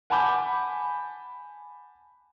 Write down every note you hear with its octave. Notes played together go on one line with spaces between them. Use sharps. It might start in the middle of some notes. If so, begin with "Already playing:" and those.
F#5 G#5 A5 B5 D6 G6